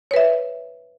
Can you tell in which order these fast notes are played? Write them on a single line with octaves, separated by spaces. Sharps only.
C#5 B4 E5